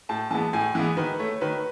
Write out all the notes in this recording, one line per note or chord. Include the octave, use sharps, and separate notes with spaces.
A2 A5
E3 G#3 B3 A5
A2 G#5
E3 G#3 B3
D#3 B4
A3 C#5
D#3 B4